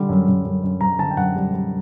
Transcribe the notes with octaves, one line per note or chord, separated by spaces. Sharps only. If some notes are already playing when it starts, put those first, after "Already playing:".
Already playing: D3 G3
F#2
F#2
F#2
F#2
F#2 A#5
D3 A5
G5
F#2 F#5
G3
G3